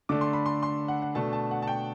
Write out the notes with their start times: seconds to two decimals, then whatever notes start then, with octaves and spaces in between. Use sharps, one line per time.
0.09 D3 A3 D4 D6
0.21 C6
0.33 B5
0.46 C6
0.63 C6
0.88 F#5
1.02 F#5
1.15 B2 A3 D4 A5
1.33 A5
1.51 F#5
1.62 A5
1.68 G5